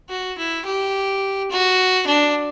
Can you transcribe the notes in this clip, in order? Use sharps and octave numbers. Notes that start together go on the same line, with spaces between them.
F#4
E4
G4
F#4
D4